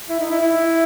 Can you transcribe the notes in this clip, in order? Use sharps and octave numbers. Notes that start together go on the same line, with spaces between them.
E4
D#4
E4
E4